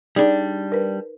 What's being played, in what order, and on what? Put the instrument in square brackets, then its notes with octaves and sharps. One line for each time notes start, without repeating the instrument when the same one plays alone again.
[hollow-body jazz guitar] G3 D4 [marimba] D#4 G#4
[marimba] A#4 B4